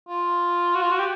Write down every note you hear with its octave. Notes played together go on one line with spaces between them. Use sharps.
F4
F#4
F4
F#4
G4